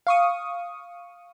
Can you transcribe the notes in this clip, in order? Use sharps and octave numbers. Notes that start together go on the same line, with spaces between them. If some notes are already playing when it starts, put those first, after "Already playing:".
F5 C#6 D#6